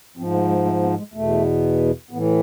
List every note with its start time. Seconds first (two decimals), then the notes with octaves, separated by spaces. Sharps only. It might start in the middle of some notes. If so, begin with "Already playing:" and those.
0.17 G#2 F3 C4
0.33 A3
0.49 G#3
0.65 A3
0.82 B3
0.98 G#3
1.14 E2 B2 A3
2.11 A2 E3 B3